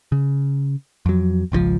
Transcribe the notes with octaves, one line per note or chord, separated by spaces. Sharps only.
C#3
F2 F#3
G#1 C#2 D3 F3